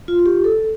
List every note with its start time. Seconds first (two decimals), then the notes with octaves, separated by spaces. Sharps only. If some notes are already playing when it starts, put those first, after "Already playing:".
0.08 F4
0.19 F4
0.26 G4
0.44 A4